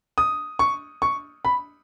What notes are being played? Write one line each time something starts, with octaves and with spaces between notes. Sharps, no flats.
D#6
C#6
C#6
B5